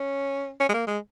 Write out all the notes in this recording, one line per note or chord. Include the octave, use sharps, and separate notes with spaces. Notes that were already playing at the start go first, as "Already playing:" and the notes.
Already playing: C#4
C#4
G#3
A#3
G#3